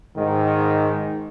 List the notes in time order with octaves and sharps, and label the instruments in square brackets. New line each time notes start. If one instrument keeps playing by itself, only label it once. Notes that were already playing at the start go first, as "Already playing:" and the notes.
[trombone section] G#2 D#3